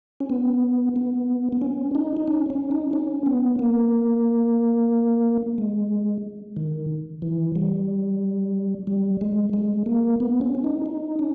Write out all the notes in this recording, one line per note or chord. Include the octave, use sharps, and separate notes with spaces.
C#4
B3
B3
B3
C#4
D#4
D#4
C#4
C#4
D#4
C#4
B3
A#3
G#3
D#3
E3
G3
G3
G#3
G#3
A#3
B3
C#4
C#4
D#4
D#4
C#4